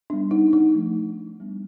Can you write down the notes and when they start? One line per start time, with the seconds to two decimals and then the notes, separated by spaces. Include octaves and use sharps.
0.10 G3 B3 D4
0.31 D#4
0.53 D#4
0.75 F3 A3 D4
1.40 G3 B3 D4